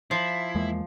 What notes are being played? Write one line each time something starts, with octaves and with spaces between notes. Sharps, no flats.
F3 E4 C7
E2 G#3 A#3